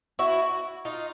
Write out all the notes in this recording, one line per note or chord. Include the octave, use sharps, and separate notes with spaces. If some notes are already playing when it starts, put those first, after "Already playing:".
E4 F#4
D#4 F4